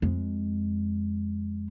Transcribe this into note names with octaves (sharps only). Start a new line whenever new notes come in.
F2 G#3